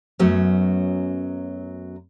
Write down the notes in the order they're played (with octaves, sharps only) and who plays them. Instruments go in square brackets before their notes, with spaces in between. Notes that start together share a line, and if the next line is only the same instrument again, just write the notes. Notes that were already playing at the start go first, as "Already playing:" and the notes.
[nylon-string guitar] F#2 F#3 A3 B3 C#4